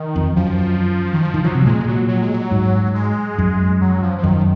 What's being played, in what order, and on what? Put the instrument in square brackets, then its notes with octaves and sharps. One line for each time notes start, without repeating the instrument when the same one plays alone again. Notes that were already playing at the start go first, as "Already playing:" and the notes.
Already playing: [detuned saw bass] D#3
[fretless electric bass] F2
[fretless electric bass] F#2 [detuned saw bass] F3
[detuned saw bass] D#3
F3
[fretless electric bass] D#3
[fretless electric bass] F3 [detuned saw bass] F#3
[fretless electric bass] C3
[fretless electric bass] A#2 [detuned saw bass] G#3
[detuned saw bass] F#3
F#3
G#3
F#3
[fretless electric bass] G#2
[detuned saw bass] G#3
[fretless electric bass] F#2
[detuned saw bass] F#3
F3
F3
[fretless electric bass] F#2 [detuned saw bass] D#3